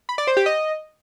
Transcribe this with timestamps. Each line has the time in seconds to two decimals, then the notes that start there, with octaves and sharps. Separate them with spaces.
0.09 B5
0.18 D5
0.27 C5
0.37 G4
0.46 D#5